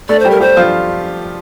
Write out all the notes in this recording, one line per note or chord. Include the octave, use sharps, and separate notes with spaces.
A3 A4 D5
C5
G3 G4
A#4
G3 G4 C5
F3 F4